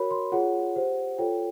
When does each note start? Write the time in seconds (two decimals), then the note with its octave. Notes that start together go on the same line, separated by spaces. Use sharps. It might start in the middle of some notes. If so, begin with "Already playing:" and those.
Already playing: F#4 A#4 C#5 B5
0.11 C6
0.32 F4 G#4 C#5 F#5
0.76 G4 C5
1.18 F4 A4 C#5 G5